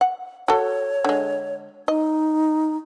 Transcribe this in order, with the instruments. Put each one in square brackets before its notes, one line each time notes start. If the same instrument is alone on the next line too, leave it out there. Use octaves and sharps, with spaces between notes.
[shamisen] F#5
[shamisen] F#4 A4 [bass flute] C#5
[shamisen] D3 G#3
[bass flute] D#4 [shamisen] D#5